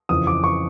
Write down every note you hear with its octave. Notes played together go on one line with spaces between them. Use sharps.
F2 C#3 E3 D#6
D6
C#6